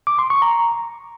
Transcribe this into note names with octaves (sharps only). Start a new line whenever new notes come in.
D6
C6
C#6
A#5